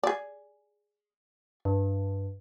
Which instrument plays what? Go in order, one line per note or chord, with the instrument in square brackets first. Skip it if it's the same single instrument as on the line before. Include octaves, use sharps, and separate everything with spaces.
[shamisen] G#4 D5
[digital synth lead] G2